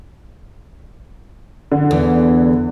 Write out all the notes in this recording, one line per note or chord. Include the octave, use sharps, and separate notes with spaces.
D3
E2